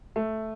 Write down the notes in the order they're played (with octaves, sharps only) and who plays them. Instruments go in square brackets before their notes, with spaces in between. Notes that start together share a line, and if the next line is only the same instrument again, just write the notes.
[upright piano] A3